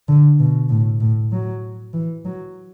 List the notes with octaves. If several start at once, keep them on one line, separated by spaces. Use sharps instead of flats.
D3
B2
A2
A2
F#3
E3
F#3